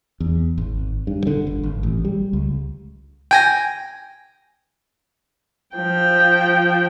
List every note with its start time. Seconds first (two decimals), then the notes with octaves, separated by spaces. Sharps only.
0.20 E2
0.58 G#1
1.07 G2
1.27 D3
1.47 G1
1.63 G#1
1.83 A1
2.05 G3
2.33 C#2
3.31 G5 G#5 A#6
5.77 F3 G5